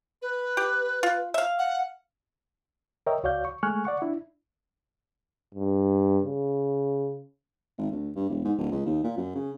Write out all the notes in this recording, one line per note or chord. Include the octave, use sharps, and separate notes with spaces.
B4
G4
F4
E5 F5
F#5
A#4 C#5 D#5 E5 G5
C#2 F#4 C#5 D5 F5 G6
C#6
G#3 A3 G#5 C#6 F6 F#6
D5 F#5 C#6
D4 E4
G2
C#3
G#1
D2
G2
E1
G#2
D1
C#2
D#2
A#2
F#2
C#3